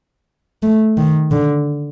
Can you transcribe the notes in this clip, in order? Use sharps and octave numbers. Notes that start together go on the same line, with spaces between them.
A3
D#3
D3